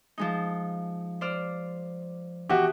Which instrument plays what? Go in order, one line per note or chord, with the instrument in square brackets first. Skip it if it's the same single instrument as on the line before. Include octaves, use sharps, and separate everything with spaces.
[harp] F3 G#3 D#4
C5 D5 F6
[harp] B2 E3 [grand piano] F#4 G4